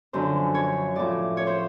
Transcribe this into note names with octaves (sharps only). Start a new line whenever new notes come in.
F#2 D3 F3 C5
C#5
A2 F3 D5
C#5
C5